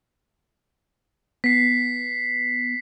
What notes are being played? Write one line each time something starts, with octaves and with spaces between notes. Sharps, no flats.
B3 B6 C7